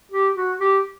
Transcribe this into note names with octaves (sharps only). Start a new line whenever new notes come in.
G4
F#4
G4